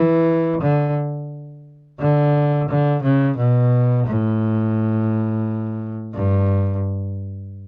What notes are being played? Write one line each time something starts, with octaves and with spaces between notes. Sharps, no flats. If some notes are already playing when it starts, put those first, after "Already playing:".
Already playing: E3
D3
D3
D3
C#3
B2
A2
G2